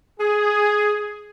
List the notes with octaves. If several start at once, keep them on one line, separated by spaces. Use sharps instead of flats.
G#4